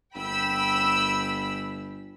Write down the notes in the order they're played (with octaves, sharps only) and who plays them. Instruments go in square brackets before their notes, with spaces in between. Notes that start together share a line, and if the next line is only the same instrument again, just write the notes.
[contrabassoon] G1 [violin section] G5 B5 E6